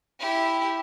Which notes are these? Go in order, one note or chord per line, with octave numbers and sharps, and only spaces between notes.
E4 G4